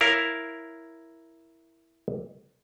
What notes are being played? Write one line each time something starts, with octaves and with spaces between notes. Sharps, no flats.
E4 A#4 C#5 F5